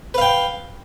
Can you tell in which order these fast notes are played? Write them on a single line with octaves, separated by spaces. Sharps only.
B4 F5 G5